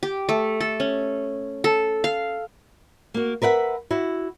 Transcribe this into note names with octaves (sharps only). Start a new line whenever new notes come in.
G4
A3
A4
C#4
A4
F5
A#3 F#4
A#4 B4 E5 F#5
E4 F#4